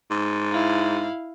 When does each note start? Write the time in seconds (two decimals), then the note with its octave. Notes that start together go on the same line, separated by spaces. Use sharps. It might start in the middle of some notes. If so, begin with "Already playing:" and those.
0.11 G#2
0.52 E4 F5